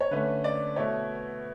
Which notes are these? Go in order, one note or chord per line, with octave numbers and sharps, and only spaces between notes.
C#5
D3 A3 C#4 B4
D5
B2 A3 E4 C#5